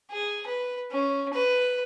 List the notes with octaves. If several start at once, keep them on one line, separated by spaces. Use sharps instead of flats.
G#4
B4
C#4
B4